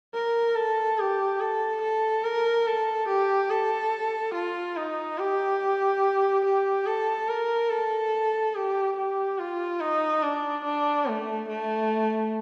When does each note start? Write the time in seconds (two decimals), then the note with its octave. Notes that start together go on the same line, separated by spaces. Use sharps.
0.14 A#4
0.56 A4
0.99 G4
1.40 A4
1.82 A4
2.24 A#4
2.67 A4
3.08 G4
3.50 A4
4.35 F4
4.76 D#4
5.18 G4
6.45 G4
6.87 A4
7.29 A#4
7.70 A4
8.55 G4
8.97 G4
9.39 F4
9.81 D#4
10.23 D4
10.65 D4
11.07 A3
11.49 A3